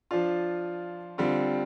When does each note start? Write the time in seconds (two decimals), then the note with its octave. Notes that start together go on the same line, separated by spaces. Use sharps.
0.11 F3 D4 F4
1.18 D3 G3 C4 F4